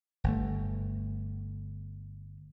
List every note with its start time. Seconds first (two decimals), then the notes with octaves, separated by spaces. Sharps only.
0.24 G1 A3